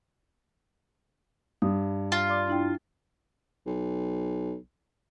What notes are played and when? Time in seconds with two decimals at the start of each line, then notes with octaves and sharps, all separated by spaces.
1.62 G2 D#6
2.12 F4
2.29 D5 C6 D6
2.47 D4 E4 G5
3.66 B1